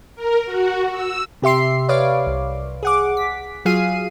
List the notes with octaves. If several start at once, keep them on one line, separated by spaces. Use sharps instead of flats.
A#4
F#4
E6
C3 G4 E5 C6 C7
B4 C#5 D5 F5 D6
C2
G#4 F#5 D6
B6
F#3 F4 G#4 F5 C7 D#7